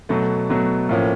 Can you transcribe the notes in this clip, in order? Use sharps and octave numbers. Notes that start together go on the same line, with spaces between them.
B2 F#3 A3
B2 F#3 A3
A2 F3 A#3 C#4